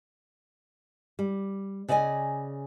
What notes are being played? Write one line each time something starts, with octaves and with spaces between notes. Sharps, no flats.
G3
C#3 D5 D#5 F5 G#5